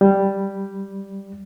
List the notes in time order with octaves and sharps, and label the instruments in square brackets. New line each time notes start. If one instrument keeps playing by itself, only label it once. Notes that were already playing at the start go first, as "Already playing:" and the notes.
[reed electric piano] G3